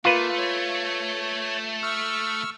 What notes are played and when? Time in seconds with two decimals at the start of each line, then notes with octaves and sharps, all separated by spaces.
0.05 A3 A#3 F4 B4
0.38 C#5
1.83 C#6 E6 F6